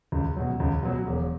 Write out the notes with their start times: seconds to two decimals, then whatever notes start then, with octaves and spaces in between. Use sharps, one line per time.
0.12 C#2
0.36 B2 F#3
0.60 C#2
0.83 B2 F#3
1.07 E1